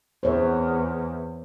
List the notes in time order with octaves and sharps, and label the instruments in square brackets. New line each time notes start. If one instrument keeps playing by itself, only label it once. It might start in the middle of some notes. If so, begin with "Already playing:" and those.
[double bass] E2 [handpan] C5 C#5